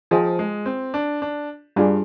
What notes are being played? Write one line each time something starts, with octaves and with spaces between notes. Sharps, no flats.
F3 F4 G#4 C5 D#5 G5
G#3
C4
D4
D4
G2 G3 D4 F4 G#4